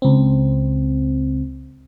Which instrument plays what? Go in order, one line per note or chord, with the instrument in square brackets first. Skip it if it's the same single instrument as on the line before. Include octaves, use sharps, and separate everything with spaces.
[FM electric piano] C#2 C4